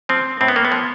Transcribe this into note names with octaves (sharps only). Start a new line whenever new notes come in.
F3 C4
A2 C4
B3
A#3
B3
F3